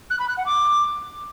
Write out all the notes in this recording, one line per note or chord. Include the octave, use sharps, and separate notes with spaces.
F#6
B5
F#6
F#5
D6